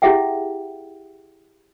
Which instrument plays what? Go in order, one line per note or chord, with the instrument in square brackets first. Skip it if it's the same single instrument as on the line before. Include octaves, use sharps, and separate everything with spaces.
[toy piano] E4 G4 G#4 E5 F#5 G5